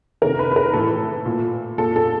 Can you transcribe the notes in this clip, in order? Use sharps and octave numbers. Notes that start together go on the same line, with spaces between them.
C3 D#3 A#4
B4
B4
A#4
A2 E3 A4
A#2
A#2 A4
A4